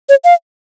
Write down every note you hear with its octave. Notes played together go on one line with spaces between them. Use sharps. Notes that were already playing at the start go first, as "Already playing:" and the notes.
C#5
F5